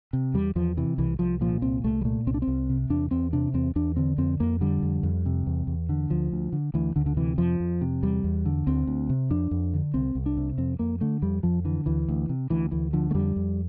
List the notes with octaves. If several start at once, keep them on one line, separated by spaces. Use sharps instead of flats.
C3
E2 G3
E2 F3
C3 E3
C2 E3
C2 F3
A#2 F3
C2 C4
C2 A3
G3
A#2 A3
C2 C4
D4
C4
C2
C3
E2 D4
E2 C4
C3 D4
E2 C4
E2 D4
D3 C4
F2 C4
F2 A#3
D3 G3
F2
F2
C3
E2
E2
D3
D2 F3
D2
D3
D2 E3
D2 D3
D3
C3 E3
F2 F3
F2
C3
E2 G3
E2
D3
D2 C4
D2
C3
F2 D4
F2
D3
C2 C4
C2
D4
C3
F2 C4
F2 A#3
D3 A3
F2 G3
F2 F3
D3 E3
D2 E3
D2
C3
D2 E3
D2 E3
D3 F3
A3
F2 G3
F2